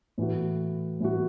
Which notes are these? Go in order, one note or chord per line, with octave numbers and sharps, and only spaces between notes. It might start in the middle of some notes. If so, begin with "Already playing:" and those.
A2 E3 B3 F#4
A2 E3 B3 F#4